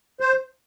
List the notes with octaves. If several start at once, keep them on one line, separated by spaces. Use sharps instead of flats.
C5